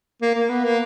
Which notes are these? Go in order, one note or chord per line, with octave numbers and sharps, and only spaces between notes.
A#3
A#3
B3
A#3